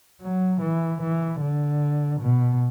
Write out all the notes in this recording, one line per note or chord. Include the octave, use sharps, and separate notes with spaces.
F#3
E3
E3
D3
B2